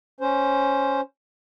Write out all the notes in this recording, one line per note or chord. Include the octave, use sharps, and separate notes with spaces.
C#4 C5